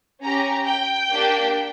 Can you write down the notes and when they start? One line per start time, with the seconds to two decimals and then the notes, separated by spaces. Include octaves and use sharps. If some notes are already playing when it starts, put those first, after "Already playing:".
0.21 C#4 G4 A#5
0.66 G5
1.12 A#3 D4 G4